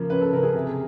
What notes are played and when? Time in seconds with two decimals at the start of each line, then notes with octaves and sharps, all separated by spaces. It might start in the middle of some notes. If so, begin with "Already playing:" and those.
Already playing: C#3 F3 A#3
0.10 C#4 B4
0.21 A4
0.33 C#3 A#4
0.43 G#4
0.55 C3